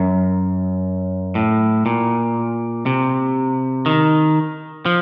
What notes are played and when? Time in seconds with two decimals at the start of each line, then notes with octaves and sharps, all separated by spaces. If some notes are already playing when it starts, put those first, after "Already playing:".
Already playing: F#2
1.35 A2
1.86 A#2
2.86 C3
3.86 D#3
4.86 F3